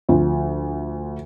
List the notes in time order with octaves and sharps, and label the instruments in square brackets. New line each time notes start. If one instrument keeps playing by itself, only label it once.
[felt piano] D2 F3